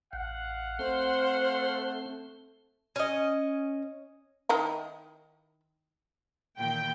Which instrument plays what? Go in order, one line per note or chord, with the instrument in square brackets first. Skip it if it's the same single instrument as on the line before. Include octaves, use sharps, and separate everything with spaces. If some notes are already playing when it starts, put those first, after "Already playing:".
[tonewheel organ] A1 [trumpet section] F5 F#5
[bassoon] A3 [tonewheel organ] C4 [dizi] C5
[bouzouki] C#4 D#5
[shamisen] D#3 D#4 E4
[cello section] A#2 D#3 E3 [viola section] G5